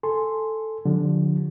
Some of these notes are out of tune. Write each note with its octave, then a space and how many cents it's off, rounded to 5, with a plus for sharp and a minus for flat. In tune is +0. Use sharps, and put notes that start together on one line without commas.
A4 +0 G#5 +0 C6 +0
D3 +0 F3 +30 G4 +15